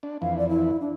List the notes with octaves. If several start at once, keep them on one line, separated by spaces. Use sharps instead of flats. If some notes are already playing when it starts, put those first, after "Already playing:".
D4
F2 E3 F5
D5
E4
D4